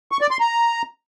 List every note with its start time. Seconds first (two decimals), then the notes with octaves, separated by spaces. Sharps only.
0.12 C#6
0.21 D5
0.31 C6
0.40 A#5